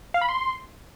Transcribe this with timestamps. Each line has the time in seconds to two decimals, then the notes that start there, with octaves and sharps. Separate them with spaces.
0.14 F5
0.21 B5
0.29 C6